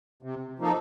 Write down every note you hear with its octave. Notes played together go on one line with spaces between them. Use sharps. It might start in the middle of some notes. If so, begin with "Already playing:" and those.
C3
F3 A#3 D#4 A4